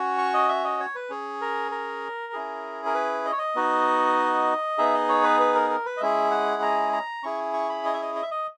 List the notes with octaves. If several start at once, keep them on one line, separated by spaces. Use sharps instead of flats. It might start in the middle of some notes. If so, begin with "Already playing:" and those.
Already playing: C#4 F#4
C#6
D#5
E5
D#5
C#5
B4
C#4 G#4
A#4
A#4
C#4 E4 G#4
A#4
B4
D#5
C#5
D#5
B3 D#4 F#4
B3 D#4 G#4 E5
D#5
C#5
B4
B4
A#4
A#4
B4
D#5
G#3 C#4 E4 G#4 E5
F#5
A#5
A#5
C#4 E4 G#4 C#6
C#6
B5
D#5
E5
D#5
D#5
E5
D#5